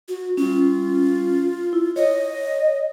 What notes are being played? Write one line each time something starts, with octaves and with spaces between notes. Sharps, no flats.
F#4
G3 C#4 F4
E4
C#5 D#5